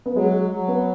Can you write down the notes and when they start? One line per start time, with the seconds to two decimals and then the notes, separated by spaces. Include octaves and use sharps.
0.06 B3
0.15 F#3 G#3
0.33 G#3
0.50 F#3
0.68 B3